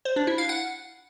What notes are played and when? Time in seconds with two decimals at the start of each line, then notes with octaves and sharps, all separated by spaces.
0.05 C5
0.16 D4
0.27 E4
0.38 F5
0.49 F#5